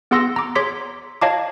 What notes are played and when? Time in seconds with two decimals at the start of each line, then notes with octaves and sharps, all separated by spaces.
0.11 B3 G#4 F#5 C6 E6 A#6
0.36 A#5 D6
0.55 G#4 C#5 C6 D6 B6
1.21 C#5 D#5 F5 A5 A#5 D6